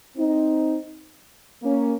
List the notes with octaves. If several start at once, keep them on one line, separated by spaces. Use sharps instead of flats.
C4 D#4
A#3 C#4